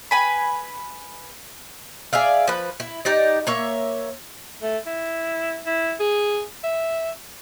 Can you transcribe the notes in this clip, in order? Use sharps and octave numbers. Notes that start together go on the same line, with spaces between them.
B4 G#5 B5
G#4 D5 E5 F5
F3 B4
E4
D#4 G4 D5 D#5
A#3 C#5 E5
A3
E4
E4
G#4
E5